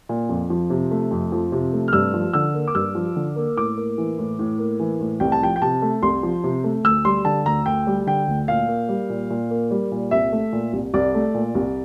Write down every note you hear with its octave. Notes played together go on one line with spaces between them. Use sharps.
A#2
F2
F3
C3
A3
F2
F3
C3
A3
F6
G2 E6
F3
D3 E6
A#3
D6
G2 E6
F3
D3
A#3
A2 D6
A#3
E3
A2
A2
A#3
E3
A2
C2 G5
A5
F3 G5
G5
C3 A5
A3
C2 C6
F3
C3
A3
D2 E6
G3 C6
D3 A5
D2 A#5
D2 G5
G3
D3 G5
D2
A#2 F5
A#3
G3
A#2
A#2
A#3
G3
A#2
C2 E5
A3
A#2
C2
C2 D5
A3
A#2
C2